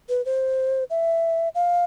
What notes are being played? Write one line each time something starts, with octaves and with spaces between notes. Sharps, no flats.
B4
C5
E5
F5